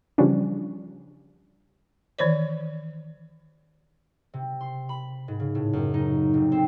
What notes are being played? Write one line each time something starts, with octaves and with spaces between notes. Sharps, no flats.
C#3 E3 F3 G3 C#4 D4
D#3 E3 C5 D5
C3
C6
B5
G#2
C#3
A2
F#2
D#4
F1
C4